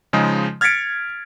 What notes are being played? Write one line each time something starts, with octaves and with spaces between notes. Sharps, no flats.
C#3 F3 G#3 D#4
F6 G#6 A6 B6 C#7 D7